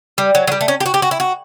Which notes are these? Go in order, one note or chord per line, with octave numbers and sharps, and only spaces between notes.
G3
F#3
F#3
G3
A3
C#4
G4
F#4
G4
F#4
E4
F#4